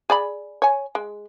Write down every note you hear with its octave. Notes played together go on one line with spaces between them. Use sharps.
G#4 D5 B5
C#5 G#5
G#3